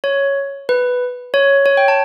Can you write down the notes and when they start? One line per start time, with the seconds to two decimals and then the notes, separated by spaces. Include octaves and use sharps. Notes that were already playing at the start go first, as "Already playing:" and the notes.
0.04 C#5
0.69 B4
1.34 C#5
1.66 C#5
1.77 G5
1.88 A5